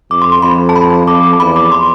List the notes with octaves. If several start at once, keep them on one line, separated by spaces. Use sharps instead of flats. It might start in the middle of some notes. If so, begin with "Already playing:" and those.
F2 D6
C6
C6
F2 B5
A5
B5
F2 D6
D6
A5
E2 B5
D6
C6